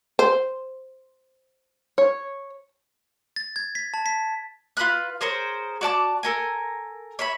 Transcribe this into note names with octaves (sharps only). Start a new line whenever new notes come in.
C5
C#5
A6
G#6
B6
A5
B6
F4 B4 B5 F#6
G#4 A#4 C5 C#5
F#4 D5 A5 D6
A4 A#4 G#5
C#5 E5 B5